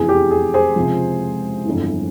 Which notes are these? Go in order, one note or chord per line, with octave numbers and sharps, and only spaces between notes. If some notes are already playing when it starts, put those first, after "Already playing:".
Already playing: F1 E2 E3 G#4
G4
G#4
G#4 C5
C#2 C3 F3
G1 F2 E3